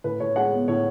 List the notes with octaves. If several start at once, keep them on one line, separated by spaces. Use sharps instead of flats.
A2 B4
A2 C#5
G#3 F#5
B3
A2 C#5